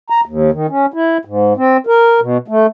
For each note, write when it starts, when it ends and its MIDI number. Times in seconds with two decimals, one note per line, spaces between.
0.10 0.21 82
0.25 0.51 39
0.52 0.67 51
0.70 0.86 61
0.94 1.18 64
1.25 1.53 44
1.57 1.77 60
1.87 2.20 70
2.20 2.37 47
2.48 2.66 57